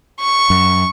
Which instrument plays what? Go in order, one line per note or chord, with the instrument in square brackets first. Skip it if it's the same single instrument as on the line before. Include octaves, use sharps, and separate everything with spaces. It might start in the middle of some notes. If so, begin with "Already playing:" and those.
[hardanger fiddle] C#6
[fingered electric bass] F#2